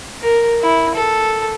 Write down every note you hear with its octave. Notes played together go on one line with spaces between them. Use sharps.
A#4
E4
A4